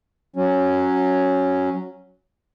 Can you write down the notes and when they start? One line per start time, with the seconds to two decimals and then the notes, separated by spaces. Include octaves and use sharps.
0.36 F#3 C#4